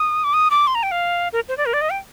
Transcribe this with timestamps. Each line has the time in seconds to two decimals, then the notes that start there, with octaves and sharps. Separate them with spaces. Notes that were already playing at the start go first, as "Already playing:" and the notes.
Already playing: D#6
0.24 D6
0.34 D#6
0.51 D6
0.67 C6
0.75 A#5
0.83 G5
0.91 F5
1.33 A#4
1.49 C5
1.58 D5
1.66 A#4
1.73 D5
1.81 D#5
1.90 G5